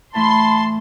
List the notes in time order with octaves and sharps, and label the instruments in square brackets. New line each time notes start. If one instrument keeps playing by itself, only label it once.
[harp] A2 E3 A3 [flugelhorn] A5 [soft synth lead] B5 [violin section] C6